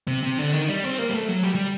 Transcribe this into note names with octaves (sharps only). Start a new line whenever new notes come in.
C3
C3
D3
D#3
G3
C4
A#3
G3
A3
F#3
G3
G3